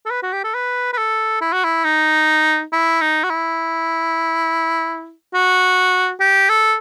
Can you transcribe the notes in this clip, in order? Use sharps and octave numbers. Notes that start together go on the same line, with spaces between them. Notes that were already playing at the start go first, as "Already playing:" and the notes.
A4
B4
F#4
G4
A4
B4
B4
A4
E4
F#4
E4
D#4
E4
D#4
F#4
E4
F#4
G4
A4